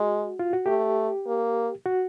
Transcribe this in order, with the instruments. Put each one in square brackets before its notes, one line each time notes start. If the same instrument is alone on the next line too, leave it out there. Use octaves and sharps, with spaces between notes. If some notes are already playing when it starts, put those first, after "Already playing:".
Already playing: [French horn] G#3 [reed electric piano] F#4
[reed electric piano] F4
F#4
[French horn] A3 [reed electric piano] G4
[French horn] A#3
[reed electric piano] F#4